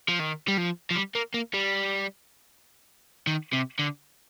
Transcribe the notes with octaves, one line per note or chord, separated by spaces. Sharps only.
F3
D#3
G3
F3
F3
G3
A#3
A#3
G3
D#3
C3
D3